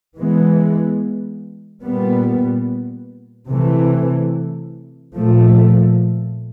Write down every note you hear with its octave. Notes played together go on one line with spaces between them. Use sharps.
E3 G#3 B3
A#2 G3 B3
C3 E3 A3
A#2 F3 A3